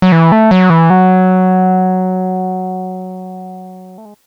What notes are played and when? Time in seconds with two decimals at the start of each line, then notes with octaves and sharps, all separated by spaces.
0.02 F#3
0.12 E3
0.32 A3
0.51 F#3
0.70 E3
0.90 F#3
3.98 A3
4.05 G#3